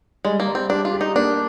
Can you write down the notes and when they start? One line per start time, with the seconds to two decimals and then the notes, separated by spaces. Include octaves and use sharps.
0.25 G3 G#3
0.40 A#3
0.48 G3
0.55 C4
0.70 D4 G4
0.85 F4
0.93 G4
1.01 D#4
1.16 A#3 D4